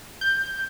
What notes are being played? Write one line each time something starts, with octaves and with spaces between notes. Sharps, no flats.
G6